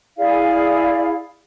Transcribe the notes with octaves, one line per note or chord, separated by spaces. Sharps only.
E4 G#4 D5 F5